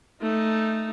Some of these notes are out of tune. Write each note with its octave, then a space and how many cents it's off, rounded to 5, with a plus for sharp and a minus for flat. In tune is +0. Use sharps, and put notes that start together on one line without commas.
A3 +0 D#4 +0